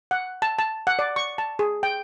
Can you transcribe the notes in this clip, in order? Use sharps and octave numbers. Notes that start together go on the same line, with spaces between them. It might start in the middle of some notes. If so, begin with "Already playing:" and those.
F#5
A5
A5
F#5
D5
C#6
A5
G#4
G5